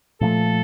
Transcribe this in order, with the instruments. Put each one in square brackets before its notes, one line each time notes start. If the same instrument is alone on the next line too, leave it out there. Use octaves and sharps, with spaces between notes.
[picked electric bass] A#2 F3 A3 [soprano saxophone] A4